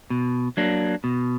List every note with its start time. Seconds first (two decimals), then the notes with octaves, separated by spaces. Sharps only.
0.10 B2
0.57 F#3 A#3 D4
1.04 B2